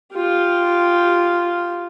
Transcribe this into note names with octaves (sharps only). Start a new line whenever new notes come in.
F4 G4